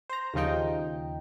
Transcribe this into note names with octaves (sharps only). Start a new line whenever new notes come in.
C5 A#5
D#2 C#3 F3 D#4 G5